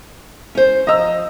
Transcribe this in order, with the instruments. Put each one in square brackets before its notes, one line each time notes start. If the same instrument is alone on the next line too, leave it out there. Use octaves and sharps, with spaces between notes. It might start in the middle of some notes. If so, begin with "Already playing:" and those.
[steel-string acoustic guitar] C#4 C5
[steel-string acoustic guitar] F3 A#5 [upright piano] D#5 E6